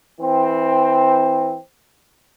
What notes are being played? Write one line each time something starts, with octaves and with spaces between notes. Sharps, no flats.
E3 C4